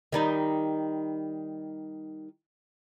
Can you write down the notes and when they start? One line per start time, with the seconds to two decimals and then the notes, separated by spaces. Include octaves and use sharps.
0.12 D#3 G3 D#4